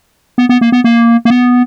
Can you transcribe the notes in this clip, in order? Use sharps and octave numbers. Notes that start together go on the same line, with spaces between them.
B3
B3
A#3
B3
A#3
A#3
B3